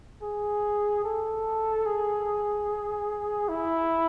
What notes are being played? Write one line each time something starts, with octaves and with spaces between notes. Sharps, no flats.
G#4
A4
G#4
E4